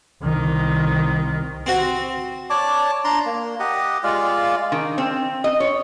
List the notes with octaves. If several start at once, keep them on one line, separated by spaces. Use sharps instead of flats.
C2 D#3
C4 F#4
C#5 D5 A5 D6
D4 A#5 C6
A#3
G4 D#5 F#5
G#3 F4 D5 F5
D#3
C4
D#5
C#5